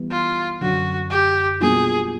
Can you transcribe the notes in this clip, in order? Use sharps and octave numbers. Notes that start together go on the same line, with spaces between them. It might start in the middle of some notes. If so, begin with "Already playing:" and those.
Already playing: E3 G3 B3
F4
F#2 D3 F#3 F#4
G4
B2 G3 A#3 D4 F4 G#4